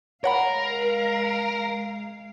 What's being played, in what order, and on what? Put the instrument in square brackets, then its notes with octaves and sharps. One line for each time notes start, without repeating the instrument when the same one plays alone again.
[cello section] G#3 F5 [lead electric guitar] A#4 [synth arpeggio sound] C#5 F#5 B5